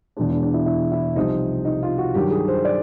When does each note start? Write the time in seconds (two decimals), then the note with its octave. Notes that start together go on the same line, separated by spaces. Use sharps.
0.17 E2 B2 G#3 D4
0.30 D4
0.42 D4
0.54 E4
0.66 E4
0.92 E4
1.15 C2 C3 F3 D#4
1.65 D#4
1.83 F4
1.98 F#4
2.14 G2 D#3 F#3 G4
2.31 G#4
2.48 C5
2.65 D5